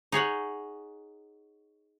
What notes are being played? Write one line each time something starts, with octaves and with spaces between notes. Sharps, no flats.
D#4 G#4 C#5 F#5